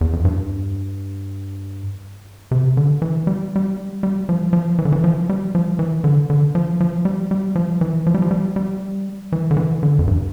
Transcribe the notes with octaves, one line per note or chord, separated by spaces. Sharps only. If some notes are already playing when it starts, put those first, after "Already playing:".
E2
F2
G2
C3
D3
E3
G3
G3
G3
F3
F3
E3
D3
E3
F3
G3
F3
E3
D3
D3
F3
F3
G3
G3
F3
E3
F3
G3
F3
G3
G3
E3
D3
E3
D3
F2
G2